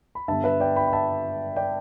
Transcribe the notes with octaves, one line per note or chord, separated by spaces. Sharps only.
B5
G2 D3 G3 B3 E5 A5
B4 E5
D5 G5
G5 B5
B5
E5 A5
D5 G5